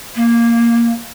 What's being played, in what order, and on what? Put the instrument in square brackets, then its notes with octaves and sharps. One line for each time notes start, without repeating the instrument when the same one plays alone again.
[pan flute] A#3